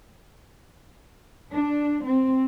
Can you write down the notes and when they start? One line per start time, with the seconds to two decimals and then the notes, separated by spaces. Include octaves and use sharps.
1.51 D4
2.04 C4